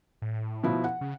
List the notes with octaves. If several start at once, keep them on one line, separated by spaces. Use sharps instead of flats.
A2
B2 F3 E4
F#5
C#3